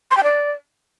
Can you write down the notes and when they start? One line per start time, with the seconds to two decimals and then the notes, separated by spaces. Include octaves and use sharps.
0.11 C6
0.17 G5
0.23 D5